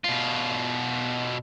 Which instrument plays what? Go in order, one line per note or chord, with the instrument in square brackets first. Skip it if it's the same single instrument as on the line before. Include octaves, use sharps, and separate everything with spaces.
[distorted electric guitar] B2 F4